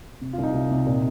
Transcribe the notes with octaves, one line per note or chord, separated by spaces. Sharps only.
C3
F4
C2 D#4
C2
C3
A#2